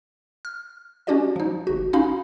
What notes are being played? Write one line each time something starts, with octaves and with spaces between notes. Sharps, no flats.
F6
C#4 D4 F#4 G4 D5 D#5
F3 D#4
G1 F#4
C#4 D#4 F#4 F5 B5